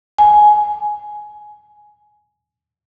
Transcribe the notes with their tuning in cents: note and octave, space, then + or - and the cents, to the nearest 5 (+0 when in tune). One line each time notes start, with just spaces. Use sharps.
G#5 +10